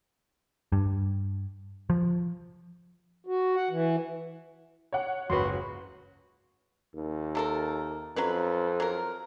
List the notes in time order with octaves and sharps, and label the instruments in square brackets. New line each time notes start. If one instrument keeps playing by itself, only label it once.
[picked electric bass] G2
F3
[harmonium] F#4
F#5
E3
[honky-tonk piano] C#5 F#5
[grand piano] F#1 C#2 G#2 [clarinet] F#4 [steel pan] B4 C6
[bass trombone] D#2
[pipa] C3 A4 A#4
[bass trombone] F2 [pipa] F#3 C#4 B4
[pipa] F#3 A#4